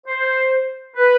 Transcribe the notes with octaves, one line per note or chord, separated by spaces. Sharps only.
C5
B4